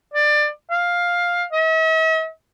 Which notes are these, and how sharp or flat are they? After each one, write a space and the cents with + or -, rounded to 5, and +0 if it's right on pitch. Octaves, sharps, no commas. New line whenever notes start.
D5 +20
F5 +10
E5 -45